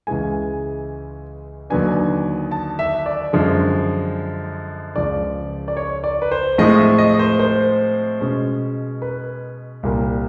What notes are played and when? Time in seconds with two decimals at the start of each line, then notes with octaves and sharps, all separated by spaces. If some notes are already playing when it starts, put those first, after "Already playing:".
0.07 C#2 C#3 E3 G#3 G#5
1.70 D#2 D3 F#3 B3 D4 G#5
2.51 A5
2.79 E5
3.06 D5
3.33 F#2 D3 F3 G#3
4.96 C#2 C#3 F3 D5
5.68 D5
5.77 C#5
6.04 D5
6.22 B4
6.31 C5
6.58 A2 F3 G#3 C4 D#5
6.78 E5
6.98 D#5
7.19 C5
7.39 C5
8.21 B2 G#3 C#4
9.02 B4
9.83 C2 A#2 G3 A#3